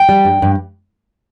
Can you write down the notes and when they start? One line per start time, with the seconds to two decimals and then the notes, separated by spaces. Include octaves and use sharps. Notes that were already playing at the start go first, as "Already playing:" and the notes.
Already playing: G5
0.09 G3
0.25 G2
0.42 G2